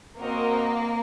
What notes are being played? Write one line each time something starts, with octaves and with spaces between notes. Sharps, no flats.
A#3 C4 F#4 A#4 D#5